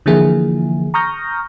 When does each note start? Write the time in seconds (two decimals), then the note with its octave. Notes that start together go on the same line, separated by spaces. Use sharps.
0.06 D3 E3 F3 A#3 E4 G#4
0.94 A#5 C#6 D#6 F6 G6 A#6